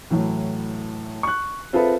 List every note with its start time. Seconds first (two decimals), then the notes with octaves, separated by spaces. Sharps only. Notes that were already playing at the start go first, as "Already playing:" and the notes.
0.10 A2 E3 F#3 A3
1.23 C#6 F#6
1.73 C4 F4 G#4 A4 B4 E5